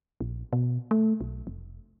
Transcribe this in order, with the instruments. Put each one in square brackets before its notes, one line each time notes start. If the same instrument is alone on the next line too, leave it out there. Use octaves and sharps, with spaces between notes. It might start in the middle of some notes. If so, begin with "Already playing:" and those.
[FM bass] A#1
B2
A3
B1
F1